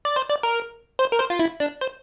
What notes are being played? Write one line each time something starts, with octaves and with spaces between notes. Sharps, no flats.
D5
C5
D5
A#4
C5
A#4
C5
F4
E4
D4
C5